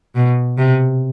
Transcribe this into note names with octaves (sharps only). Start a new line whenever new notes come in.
B2
C3